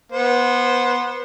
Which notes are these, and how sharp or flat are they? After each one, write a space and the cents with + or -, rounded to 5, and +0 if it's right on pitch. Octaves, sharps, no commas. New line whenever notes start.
B3 -20 C5 +0